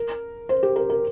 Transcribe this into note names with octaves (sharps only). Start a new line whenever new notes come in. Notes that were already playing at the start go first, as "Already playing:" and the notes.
Already playing: A#4
C5
G4
A#4
A#4